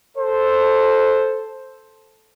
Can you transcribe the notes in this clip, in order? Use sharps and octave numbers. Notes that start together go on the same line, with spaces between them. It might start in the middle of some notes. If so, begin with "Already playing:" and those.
A4 C5